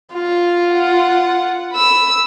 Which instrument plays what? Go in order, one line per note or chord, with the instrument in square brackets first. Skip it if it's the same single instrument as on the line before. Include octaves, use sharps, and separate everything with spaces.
[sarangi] F4
[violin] F#5
B5 E6